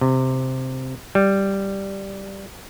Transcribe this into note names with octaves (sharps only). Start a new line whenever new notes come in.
C3
G3